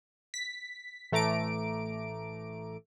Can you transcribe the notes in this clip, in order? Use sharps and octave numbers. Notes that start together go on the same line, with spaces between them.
B6
A1 A3 A#5 D6 D7